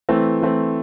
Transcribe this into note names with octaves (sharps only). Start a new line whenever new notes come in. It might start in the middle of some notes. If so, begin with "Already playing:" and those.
E3 A3 C4
E3 A3 C4